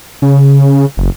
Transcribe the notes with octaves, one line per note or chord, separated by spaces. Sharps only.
C#3
F#1